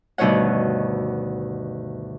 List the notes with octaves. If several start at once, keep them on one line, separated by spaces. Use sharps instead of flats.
D2 G2 B2 D#3 C#5 F#5